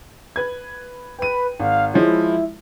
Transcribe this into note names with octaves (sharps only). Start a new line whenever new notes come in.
B4 G#6
B4 G5 D#7
G#1 F5
F3 G#3 E4 C#5